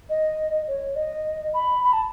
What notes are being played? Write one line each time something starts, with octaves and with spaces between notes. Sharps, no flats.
D#5
C#5
D#5
B5
B5
A5